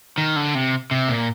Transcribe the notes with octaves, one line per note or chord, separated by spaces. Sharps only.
D#3
D3
C3
C3
A#2